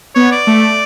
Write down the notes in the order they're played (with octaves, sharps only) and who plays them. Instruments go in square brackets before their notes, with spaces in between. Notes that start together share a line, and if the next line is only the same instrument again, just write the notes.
[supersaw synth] B3 [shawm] C#5
[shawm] D5
[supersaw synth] A3